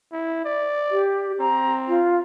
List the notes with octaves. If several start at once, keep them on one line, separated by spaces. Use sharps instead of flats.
E4
D5
G4
C4 A#5
F4